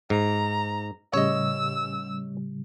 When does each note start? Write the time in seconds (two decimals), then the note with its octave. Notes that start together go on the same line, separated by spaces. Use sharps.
0.10 G#2 A#5
1.14 A2 C#3 G3 C#5 D#5 E6